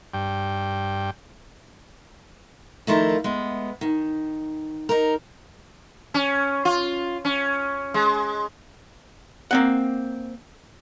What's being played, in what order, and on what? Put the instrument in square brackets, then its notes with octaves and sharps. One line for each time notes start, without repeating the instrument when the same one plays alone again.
[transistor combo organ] G2 G5
[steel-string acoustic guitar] D#3 F3 A3 E4 F4 A#4
G#3 A3 B3
D#3
D#4 A#4
[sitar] C#4
F4
C#4
G#3
[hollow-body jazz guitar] A#3 C4 F#5